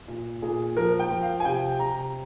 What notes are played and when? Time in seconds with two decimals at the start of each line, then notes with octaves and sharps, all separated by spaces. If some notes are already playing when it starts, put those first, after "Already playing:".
0.08 A#2
0.42 A#2 G#4
0.77 F3 A#4
0.99 G5
1.11 F3
1.23 F5
1.40 G#5
1.45 C3 G5
1.80 C3 A#5